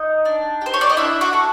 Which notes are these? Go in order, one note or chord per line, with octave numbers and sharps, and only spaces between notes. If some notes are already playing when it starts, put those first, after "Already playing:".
Already playing: D#4 D#5
D4
G4 C5
C#5
D5
D#5
D4 E4 E5
F#4 F#5
F#4 A4